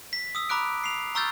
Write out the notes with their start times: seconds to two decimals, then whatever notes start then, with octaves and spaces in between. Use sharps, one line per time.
0.13 B6
0.35 D#6 E6
0.49 A#5 B5 D6 F#6 D7
0.84 C7 F7
1.15 A#5 C#6 E6 F6 G6 A6